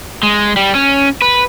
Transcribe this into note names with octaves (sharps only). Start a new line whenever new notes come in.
G#3
G3
C#4
B4